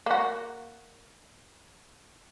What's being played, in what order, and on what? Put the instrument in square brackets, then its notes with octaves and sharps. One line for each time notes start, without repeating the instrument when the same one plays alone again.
[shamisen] A#3 F#4